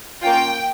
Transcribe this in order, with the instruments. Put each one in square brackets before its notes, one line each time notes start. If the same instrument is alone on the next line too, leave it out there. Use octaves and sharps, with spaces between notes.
[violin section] A#3 C#4 F4 G5